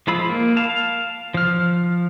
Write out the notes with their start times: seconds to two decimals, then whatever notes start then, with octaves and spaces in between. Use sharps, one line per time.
0.07 F3 G#3 F4 B5 E6
0.30 A#3
0.56 F5 A5
1.34 F3 F6